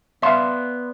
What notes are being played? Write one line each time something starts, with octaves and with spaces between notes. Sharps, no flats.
B3 D5 E5 F5 C6 F6